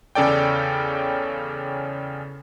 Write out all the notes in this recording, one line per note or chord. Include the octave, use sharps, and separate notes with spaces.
E2 C#3 C#4 A4 D5 G5